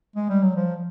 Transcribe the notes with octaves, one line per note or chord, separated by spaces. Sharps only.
G#3
G3
F#3
F3